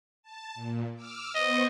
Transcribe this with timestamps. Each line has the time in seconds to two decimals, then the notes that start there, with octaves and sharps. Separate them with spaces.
0.23 A5
0.55 A#2
0.94 D6 E6 F6
1.34 B3 C5 D#5 C#6